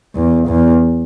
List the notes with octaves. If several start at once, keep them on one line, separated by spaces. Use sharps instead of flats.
E2
E2